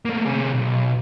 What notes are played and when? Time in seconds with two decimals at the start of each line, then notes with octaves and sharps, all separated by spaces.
0.05 A3 A#3
0.26 C3 G#4
0.53 B1